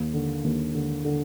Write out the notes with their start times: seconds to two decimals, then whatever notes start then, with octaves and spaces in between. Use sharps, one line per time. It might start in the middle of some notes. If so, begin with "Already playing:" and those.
Already playing: D#2
0.14 D3
0.44 D#2
0.75 D3
1.05 D3